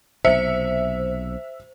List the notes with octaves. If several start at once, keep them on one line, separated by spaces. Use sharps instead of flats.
B1 C3 C5 E5 C#7